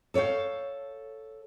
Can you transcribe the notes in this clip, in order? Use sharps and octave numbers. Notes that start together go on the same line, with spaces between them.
A4 C#5 E5 F5 G5